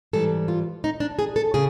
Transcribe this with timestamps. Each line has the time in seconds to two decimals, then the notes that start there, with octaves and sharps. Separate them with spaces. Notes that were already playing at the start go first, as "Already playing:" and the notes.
0.13 G#2 E3 G3 A4
0.48 F4
0.84 D#4
1.00 D4
1.19 G#4
1.36 A4
1.54 C#3 G#4